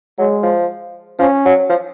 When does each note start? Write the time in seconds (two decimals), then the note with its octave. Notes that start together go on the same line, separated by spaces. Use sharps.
0.18 F#3 G#3
0.43 F3
1.19 F3 C#4
1.45 F#3
1.70 F3